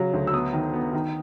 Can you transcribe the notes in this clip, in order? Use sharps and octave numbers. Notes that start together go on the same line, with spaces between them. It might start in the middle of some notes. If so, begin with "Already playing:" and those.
Already playing: C#3 F#3
D2
E6
B3 D#6
D#3
B3
D#3